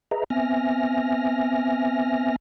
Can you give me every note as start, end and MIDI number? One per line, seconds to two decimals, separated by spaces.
0.11 0.24 68
0.11 0.24 71
0.11 0.24 75
0.11 0.24 76
0.11 0.24 82
0.30 2.36 59
0.30 2.36 60
0.30 2.36 76
0.30 2.36 80
0.30 2.36 89
0.30 2.36 94